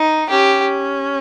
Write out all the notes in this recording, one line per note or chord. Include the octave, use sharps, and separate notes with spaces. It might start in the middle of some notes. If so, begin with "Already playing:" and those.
Already playing: D#4
C#4 G4